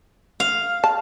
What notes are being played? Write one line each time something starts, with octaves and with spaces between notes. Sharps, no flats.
F5
A5